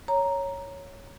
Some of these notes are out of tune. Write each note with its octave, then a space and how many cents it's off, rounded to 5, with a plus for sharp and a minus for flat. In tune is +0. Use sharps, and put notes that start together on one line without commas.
C#5 +0 A#5 +0